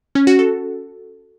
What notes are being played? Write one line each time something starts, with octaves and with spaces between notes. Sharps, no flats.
C#4
F#4
A4